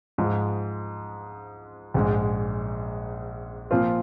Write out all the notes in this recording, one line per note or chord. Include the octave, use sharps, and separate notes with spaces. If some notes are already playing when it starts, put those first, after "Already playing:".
G#2 F3 G#3
A#1 G#2 G#3
A#2 F3 C4 F4